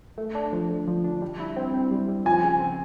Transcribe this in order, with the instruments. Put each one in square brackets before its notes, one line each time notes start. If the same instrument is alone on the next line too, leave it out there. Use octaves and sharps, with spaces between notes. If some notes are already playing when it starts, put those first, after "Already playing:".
[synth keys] A3
D4
F3
D3
F3
D4
G3
E4
C4
C4
G3
G3
[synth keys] F3 [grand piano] G#5
[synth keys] C#3
C4